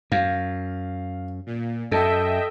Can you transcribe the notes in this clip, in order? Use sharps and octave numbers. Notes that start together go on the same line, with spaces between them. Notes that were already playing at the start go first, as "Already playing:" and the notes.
F#2 F5
A#2
F#2 A4 D#5 E5 G5 A5